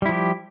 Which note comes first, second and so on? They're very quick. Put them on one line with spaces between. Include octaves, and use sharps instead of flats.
G3 E4 F3 G4